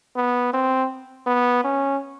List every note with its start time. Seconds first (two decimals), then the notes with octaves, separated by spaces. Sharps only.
0.16 B3
0.53 C4
1.27 B3
1.64 C#4